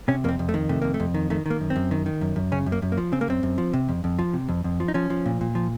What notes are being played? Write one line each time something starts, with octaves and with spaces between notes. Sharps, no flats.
C3 C#4
F2 A#3 C4
F2
A3
D#3
C3 A3
F2 A#3
A3
F2
D#3
D#3 A3
D#3 A#3
F#2
C4
F#2
D#3
D#3
F#2
F#2
C#3 C#4
F#2
A#3
F#2
A#3
F3
C#3 C4
A#3
F#2 C4
F#2
F3
C3
F2
F2
F3
C3
F2
F2
F3
D#4
F3 C#4
F3
A#2
A#2
F3